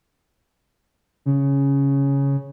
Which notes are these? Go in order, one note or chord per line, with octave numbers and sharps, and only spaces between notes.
C#3